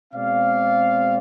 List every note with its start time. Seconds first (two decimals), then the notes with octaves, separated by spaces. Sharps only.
0.13 B2 G#3 C4 D5 F5